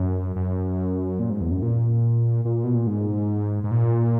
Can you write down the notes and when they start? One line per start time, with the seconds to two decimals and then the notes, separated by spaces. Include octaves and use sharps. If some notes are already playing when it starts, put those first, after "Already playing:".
Already playing: F#2
0.36 F#2
1.19 A#2
1.30 G#2
1.41 E2
1.51 F#2
1.62 A#2
2.45 A#2
2.64 B2
2.75 A#2
2.87 G#2
3.64 G#2
3.71 A#2